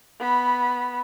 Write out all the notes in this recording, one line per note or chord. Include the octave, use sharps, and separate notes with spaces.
B3 B5